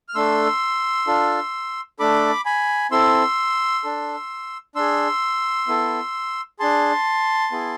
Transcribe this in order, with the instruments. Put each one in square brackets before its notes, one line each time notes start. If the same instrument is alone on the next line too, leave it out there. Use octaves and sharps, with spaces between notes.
[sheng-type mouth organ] F6
A3 D4 A4 C6 E6
D4 F4 A4
A3 D4 A4 B5 D6
G#5 B5
C4 E4 A4 C6 E6
D4 A4
D4 G#4 C6 E6
B3 E4 A4
D4 G#4 A5 C6
B3 E4 G#4